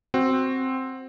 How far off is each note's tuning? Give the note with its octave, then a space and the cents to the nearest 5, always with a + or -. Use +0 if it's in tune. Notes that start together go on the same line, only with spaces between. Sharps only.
C4 +0 F#4 +0